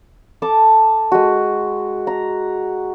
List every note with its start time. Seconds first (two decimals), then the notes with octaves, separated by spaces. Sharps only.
0.42 A4 A5 D6
1.12 G#3 F#4
2.07 A#5